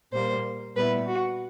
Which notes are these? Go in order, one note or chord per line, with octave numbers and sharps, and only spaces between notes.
A#2 G3 A#3 C5
A#2 G3 B3 E4 B4
F#4